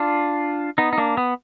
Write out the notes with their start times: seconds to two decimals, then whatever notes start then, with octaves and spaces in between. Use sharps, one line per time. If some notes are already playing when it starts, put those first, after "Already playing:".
Already playing: D4 F4
0.78 B3 D#4
0.93 D#4
0.98 A#3 D4
1.17 B3